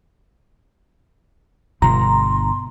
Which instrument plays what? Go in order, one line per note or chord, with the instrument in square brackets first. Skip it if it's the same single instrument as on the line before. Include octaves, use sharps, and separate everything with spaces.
[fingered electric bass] G1 [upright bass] B2 [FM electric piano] A#5 [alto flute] C6